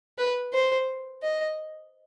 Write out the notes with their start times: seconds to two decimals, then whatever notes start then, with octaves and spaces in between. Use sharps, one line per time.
0.18 B4
0.53 C5
1.23 D#5